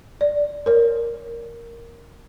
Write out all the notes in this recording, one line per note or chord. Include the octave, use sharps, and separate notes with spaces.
D5
A#4 C#5